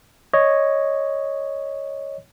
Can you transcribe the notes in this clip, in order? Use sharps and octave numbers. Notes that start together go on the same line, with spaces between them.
C#5 D#5